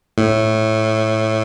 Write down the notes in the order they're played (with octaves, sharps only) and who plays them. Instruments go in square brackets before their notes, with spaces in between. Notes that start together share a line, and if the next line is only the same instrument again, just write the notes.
[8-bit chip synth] A2